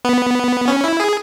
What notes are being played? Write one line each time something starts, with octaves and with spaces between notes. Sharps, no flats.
B3
C#4
E4
G#4